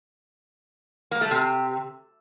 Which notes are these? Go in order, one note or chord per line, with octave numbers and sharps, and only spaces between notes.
A#3
A3
C3